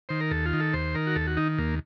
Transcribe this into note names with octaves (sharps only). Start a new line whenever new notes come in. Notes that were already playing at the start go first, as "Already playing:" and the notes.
D#3 C5
A#4
D#2 A4
F4
D#3
A4
D#2 C5
D#3 A#4
F#4
D#2 A4
F#4
D#3 D#4
D#2 A#3